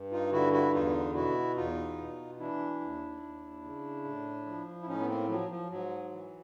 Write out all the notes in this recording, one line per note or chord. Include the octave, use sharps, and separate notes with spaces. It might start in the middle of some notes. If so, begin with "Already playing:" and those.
Already playing: G2
D#4 F4
D3 E4 F#4
E4 F#4
E2 D#4 F4
B2 E4 F#4
E2 D#4 F4
B2
E3 D4 E4
D#2
D#2
C#3
A2
F3
E4
A2 C#4 D#4
B3
A#3 C4
F3 F#3
F3
G#2 F#3
E3